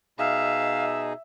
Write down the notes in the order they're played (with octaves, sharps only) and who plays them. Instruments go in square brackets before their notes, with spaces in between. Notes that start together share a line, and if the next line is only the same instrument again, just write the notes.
[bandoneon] B2 D#4 G#4 [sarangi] E5 [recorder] F5